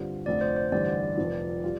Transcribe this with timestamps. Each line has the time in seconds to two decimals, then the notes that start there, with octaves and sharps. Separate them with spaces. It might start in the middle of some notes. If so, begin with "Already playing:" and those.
Already playing: G2 D3 G3 C4 F4
0.26 F1 F2 D3 A3 C4 D5
0.41 C5
0.57 C5
0.72 A1 G2 D3 D5
1.17 F1 F2 F3
1.64 G3 F4